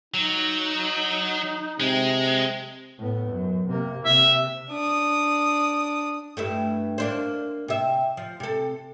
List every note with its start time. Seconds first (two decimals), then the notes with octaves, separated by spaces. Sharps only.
0.14 F#3 D#4
1.80 C3 G#3
2.99 A2 B3
3.29 F#2
3.68 C3 A#3
4.05 C3 E5
4.69 D4 D#6
6.37 G2 A3 E4
6.98 A#3 D4 C5
7.68 C3 E5
8.17 F3
8.40 C3 A4